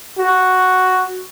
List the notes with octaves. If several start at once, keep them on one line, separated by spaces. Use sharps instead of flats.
F#4